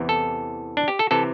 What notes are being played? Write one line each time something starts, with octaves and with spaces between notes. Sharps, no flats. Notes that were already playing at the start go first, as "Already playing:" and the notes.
Already playing: E2 C3 E3
A4
D4
G4
A4
C3 E3 A4